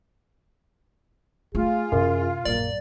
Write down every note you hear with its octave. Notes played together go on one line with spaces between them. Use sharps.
A3 F4 G#4
F#2 C3 E4
A#1 F#2 A#3 D5